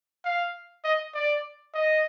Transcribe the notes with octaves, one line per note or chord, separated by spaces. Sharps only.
F5
D#5
D5
D#5